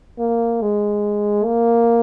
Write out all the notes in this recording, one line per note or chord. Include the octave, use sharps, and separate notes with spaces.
A#3
G#3
A#3